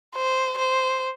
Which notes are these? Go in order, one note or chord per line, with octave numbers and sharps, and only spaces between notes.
C5
C5